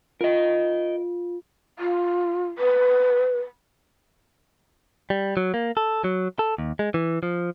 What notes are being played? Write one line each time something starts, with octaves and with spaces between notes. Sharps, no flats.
F4 A#4 D#5
F4
B4
G3
F#3
A#3
A4
F#3
A4
D#2
G#3
E3
F3